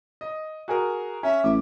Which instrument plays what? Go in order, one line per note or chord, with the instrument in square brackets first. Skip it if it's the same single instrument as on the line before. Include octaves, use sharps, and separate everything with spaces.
[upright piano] D#5
F#4 G#4 A#4
[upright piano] C#4 [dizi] E5
[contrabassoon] A1 [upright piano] D6